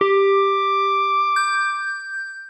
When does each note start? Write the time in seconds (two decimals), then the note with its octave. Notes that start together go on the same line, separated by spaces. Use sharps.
0.01 G4 D6
1.36 G6